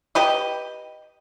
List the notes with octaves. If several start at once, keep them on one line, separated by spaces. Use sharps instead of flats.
G4 B4 D#5